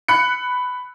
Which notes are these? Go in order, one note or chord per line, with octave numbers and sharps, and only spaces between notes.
B5 F#6 C#7